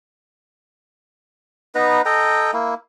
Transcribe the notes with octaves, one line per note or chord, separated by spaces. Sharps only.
B3 D#4 B4 A#5
A4 D#5 G5 A#5
A#3 E4